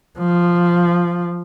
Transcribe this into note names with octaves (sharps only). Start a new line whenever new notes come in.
F3